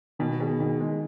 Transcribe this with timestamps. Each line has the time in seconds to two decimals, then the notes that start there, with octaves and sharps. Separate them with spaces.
0.19 B2 D#3
0.40 B2 G#4
0.60 B2 D#3
0.80 G#3 G#4